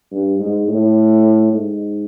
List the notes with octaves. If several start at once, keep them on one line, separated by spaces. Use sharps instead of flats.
G2
G#2
A2
G#2